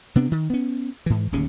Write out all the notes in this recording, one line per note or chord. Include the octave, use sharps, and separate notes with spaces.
C3 B3 D4
D#3
B3 C#4
G#2 E3
D1 D#2 C#3 C#4